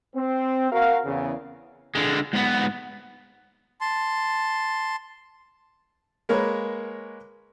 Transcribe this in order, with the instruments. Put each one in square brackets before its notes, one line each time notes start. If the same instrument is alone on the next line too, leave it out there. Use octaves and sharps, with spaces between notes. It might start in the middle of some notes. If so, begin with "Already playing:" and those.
[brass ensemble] C4
F#4 A#4 F5
E2 C#3
[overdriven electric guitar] D3 G#3
G#2 B3
[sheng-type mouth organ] A5 C6
[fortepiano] G#3 A#3 A#4 B4 C#5